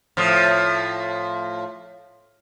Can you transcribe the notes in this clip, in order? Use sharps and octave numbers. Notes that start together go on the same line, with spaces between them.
A2 F3